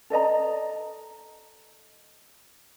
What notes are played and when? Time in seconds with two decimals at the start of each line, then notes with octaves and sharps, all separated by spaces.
0.10 A4 D5 D#5 A#5